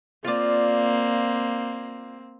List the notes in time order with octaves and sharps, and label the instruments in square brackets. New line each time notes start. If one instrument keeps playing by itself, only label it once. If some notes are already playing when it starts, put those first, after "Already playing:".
[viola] A#3 C4 [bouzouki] F4 D5